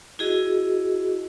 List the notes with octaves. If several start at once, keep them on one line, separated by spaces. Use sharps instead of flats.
E4 F#4 G#4 D#5